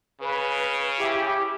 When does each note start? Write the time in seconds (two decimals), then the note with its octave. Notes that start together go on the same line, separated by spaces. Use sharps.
0.21 C#3 B4
0.97 E4 G4